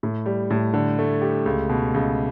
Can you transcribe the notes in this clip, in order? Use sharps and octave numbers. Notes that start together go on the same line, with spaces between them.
A2
G3
A2
D3
A3
G4
C#2
B2
C#2